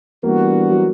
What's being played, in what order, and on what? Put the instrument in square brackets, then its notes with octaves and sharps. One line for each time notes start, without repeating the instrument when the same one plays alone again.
[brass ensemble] E3 G3 B3 D4 F#4 [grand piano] A#3
[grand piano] F#3